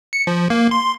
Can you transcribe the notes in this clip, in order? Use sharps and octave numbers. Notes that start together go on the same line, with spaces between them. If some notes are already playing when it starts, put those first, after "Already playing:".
C#7
F3
A#3
C6